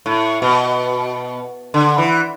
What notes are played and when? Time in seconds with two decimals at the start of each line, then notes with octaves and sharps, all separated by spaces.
0.06 A2
0.42 B2
1.74 D3
1.98 E3